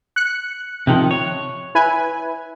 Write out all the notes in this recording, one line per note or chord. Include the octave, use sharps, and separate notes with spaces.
F#6 C#7
C3 D#3 F3
C#5
E4 B4 G#5